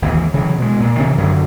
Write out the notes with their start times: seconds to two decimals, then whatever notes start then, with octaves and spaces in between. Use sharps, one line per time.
0.02 G#1 D#2 C#3 E3
0.34 C#3 E3 F#3
0.58 B2 G#3
0.80 A#2
0.98 C3 D#3 E3 C#4
1.18 F#2 D3 F#3